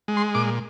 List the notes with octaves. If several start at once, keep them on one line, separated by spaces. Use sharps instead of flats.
G#3
C6
A#2 D6